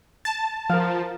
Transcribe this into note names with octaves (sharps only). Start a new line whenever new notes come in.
A5
F3 A#4 F5